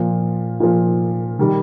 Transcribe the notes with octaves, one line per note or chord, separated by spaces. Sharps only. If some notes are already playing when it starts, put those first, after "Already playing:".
Already playing: A#2 F3
A#2 F3
D#3 G3